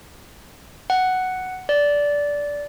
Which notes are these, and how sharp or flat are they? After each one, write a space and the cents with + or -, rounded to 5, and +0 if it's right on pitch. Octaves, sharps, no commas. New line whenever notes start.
F#5 +5
D5 -15